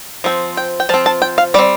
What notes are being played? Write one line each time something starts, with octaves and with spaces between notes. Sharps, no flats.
F3 C4
G5
G5
F3 C4 A5
A5
G5
F5
G3 C4 D5